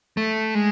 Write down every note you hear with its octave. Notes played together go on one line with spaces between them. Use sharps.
A3
G#3